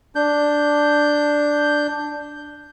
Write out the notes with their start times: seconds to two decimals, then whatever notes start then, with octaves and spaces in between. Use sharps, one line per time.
0.15 D4 G6